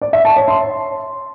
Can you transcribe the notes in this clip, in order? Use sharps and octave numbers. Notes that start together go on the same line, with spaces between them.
D5
E5
A5
C#5
C6